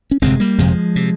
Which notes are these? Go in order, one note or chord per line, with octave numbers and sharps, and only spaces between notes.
C#4
G1 F2 C3 G#3 C4
G3 A#3
G1 F2 C3 F3 G#3
C3